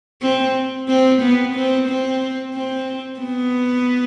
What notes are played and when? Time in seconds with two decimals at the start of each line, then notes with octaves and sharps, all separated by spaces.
0.22 C4
0.88 C4
1.22 B3
1.55 C4
1.89 C4
2.54 C4
3.20 B3